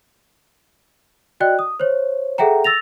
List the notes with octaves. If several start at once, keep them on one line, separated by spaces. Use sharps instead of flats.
F#4 D5 D#5 G5 F#6
D#6
C5 C#5
G#4 A4 E5 F#5 G5 A#5
E6 A6 A#6 F7